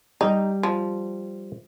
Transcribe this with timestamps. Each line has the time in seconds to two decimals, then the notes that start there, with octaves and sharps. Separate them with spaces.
0.21 G3 D#4 G4
0.63 F3